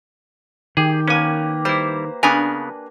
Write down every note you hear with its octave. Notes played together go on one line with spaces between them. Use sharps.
D#3 G4 G#4
A#3 C#4 B4 G#5
G3 E4 C5
C#3 B3 D4 A#4 G#5